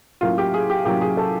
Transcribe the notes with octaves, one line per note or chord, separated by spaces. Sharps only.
A2 F#3 A#3 C#4 F4
G4
G#4
G4
A2 F#3 A#3 C#4 G4
G#4
A4